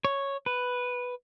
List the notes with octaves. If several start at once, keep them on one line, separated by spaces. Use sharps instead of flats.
C#5
B4